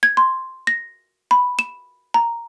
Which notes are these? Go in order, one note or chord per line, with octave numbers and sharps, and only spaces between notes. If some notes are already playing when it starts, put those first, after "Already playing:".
G#6
C6
A#6
B5
E7
A#5